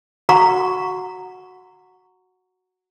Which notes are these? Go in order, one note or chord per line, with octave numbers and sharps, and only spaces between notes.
F#4 F#5 A#5 C#6